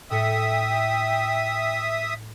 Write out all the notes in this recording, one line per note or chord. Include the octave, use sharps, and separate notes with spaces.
A2 A4 E5 G5 D#6 C#7